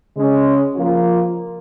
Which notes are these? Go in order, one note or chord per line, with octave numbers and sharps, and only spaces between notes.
C#3 G#3 C#4
F3 A#3 F4